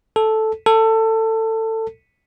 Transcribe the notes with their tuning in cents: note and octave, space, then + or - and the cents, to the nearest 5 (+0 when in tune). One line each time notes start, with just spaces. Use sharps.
A4 -5
A4 +20